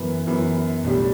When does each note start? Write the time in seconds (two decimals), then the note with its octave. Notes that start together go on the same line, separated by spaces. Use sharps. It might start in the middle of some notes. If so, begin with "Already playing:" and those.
Already playing: F#2 E3 B3
0.27 F#2 E3 B3
0.84 B1 A2 G3 D4 G4